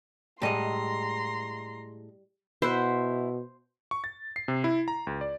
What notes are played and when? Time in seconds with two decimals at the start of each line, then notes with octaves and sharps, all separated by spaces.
0.42 A2 G3 G#3 D#5 A#5 C6
2.62 B2 E4 C5 E5 F#5
3.91 C#6
4.04 A6
4.36 C7
4.48 C3
4.64 E4
4.88 A#5
5.07 C#2
5.21 D5